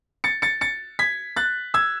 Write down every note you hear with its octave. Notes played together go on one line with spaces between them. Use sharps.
A6 C#7
A6 C#7
A6 C#7
G#6 B6
F#6 A6
E6 G#6